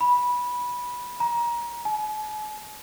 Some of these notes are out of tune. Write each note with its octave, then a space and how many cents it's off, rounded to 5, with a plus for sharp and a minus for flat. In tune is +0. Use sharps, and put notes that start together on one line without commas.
B5 -15
A#5 +25
G#5 +45